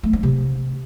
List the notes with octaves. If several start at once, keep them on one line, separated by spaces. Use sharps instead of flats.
A3
D4
C3